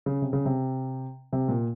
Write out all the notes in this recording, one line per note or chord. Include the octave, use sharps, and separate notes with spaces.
C#3
C3
C#3
C3
C3
A#2